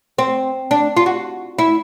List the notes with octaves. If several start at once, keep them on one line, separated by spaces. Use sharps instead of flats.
C4
D4
F4
F#4
E4